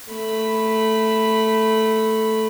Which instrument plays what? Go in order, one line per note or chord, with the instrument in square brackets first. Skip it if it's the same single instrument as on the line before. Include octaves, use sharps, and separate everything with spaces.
[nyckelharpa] A3 B5